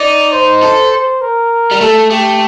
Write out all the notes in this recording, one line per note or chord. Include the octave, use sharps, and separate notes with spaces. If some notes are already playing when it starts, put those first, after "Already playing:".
Already playing: D#4 D5
C5
A4
C5
A#4
G3
A3 A4
A3 G4